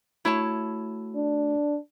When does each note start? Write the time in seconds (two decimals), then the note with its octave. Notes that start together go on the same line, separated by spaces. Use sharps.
0.25 A3 E4 F#4 C#5 A5
1.15 D4